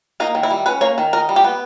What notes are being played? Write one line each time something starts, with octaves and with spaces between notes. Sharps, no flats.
A#3 D#4
D#3
E4
G3
C#4 B4
A#3 C#5
D#3
D#4 A#4
G3
G4
B3